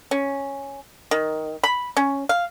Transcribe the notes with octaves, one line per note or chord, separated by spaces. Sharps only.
C#4
D#3
B5
C#4
F5